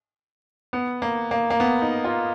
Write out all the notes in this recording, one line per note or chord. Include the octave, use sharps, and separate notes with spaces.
B3
A#3
A#3
A#3
B3
D#4
F4